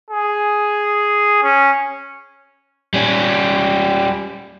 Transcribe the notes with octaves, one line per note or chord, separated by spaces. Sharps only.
G#4
C#4
G3 C#4